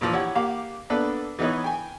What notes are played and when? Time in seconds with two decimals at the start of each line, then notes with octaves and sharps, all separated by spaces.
0.01 A#2 E3 F3
0.13 E4 G4 C#5 F#5
0.35 A#3 G4 F5 F#5 D6
0.90 A#3 B3 D4 A4 B4
1.39 E3 B3 D#4 B4 C#5 D#5
1.64 G5 G#5